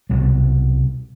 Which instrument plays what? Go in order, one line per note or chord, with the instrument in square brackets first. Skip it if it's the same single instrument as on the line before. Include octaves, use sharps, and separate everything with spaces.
[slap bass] C2 B2 G3